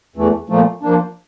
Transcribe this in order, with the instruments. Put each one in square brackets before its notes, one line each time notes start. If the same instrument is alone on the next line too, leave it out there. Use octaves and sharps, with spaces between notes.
[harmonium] E2 E3 A3
A#2 F3 A3
F3 A#3 D4